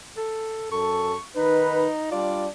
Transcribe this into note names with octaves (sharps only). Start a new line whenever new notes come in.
A4
F#2 A4 C#6
D#3 D#4 B4
G3 D4 F4 D5